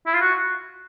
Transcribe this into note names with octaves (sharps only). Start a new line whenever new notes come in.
E4
F4
F#4